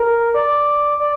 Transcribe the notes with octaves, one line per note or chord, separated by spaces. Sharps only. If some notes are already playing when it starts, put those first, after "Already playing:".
Already playing: A#4
D5
D5